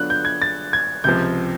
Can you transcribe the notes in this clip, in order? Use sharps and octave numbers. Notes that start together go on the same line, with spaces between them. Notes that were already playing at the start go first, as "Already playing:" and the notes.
Already playing: D3 F#3 B3 D4 F4 F#6
G6
G#6
A6
G#6
C#2 C3 F3 G6